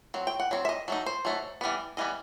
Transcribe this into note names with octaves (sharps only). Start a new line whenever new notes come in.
F#3 C4
G5
F#5
F#3 C4
E5
D#5
F#3 A3 D#4
C5
F#3 A3 D#4
E3 G3 B3
E3 G3 B3 D#5